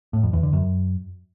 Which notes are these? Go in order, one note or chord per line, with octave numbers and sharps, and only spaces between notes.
A2
F2
E2
D3
F#2